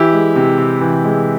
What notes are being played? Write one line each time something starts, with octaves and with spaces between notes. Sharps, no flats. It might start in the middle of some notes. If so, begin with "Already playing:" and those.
Already playing: E3 E4 G4
G#3
C3
C3
E3
G#3